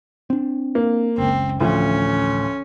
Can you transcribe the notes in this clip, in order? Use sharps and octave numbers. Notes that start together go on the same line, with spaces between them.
C4 D4
A#3
F#1 C#2 C4
A1 D2 F3 C#4